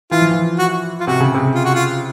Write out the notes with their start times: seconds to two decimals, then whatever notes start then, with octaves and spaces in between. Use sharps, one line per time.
0.11 E3 F4
0.22 F3
0.31 E3
0.59 F#4
1.00 F4
1.07 C3 F#4
1.21 C#3
1.34 C3
1.55 F4
1.65 F#4
1.75 F4